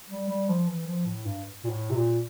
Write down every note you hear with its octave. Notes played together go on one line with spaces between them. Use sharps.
G3
G3
F3
E3
F3
A2
G2
A#2
A2
C3
A#2